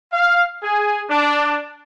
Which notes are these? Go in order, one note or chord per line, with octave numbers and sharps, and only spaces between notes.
F5
G#4
D4